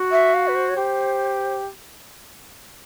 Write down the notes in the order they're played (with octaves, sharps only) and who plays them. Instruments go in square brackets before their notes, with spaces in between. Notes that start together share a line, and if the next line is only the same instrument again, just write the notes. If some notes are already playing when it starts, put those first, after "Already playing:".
Already playing: [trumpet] F#4
[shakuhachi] E5
F5
B4
C5
C#5
[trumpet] G4 [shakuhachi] C5